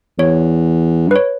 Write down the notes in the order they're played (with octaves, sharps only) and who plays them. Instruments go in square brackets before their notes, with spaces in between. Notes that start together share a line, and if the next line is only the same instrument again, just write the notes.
[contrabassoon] E2 [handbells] C#5
[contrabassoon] G2
[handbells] B4
C#5